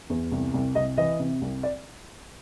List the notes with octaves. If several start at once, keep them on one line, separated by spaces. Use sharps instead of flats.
E2
C2
C2
C2 D#5
E3 D#5
C3
C2
D5